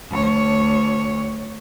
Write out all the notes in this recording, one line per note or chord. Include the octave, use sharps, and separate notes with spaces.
D2 C#5